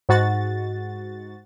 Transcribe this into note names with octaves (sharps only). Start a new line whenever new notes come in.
G#2 F#4 A6